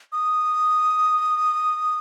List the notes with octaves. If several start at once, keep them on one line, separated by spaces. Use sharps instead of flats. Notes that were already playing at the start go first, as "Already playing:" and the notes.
D#6